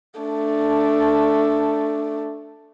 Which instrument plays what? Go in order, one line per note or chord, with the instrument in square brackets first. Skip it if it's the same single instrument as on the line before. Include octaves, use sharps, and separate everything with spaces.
[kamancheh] A3 D4